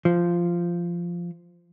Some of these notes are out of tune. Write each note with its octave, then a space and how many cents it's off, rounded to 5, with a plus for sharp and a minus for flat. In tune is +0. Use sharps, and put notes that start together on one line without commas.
F3 -10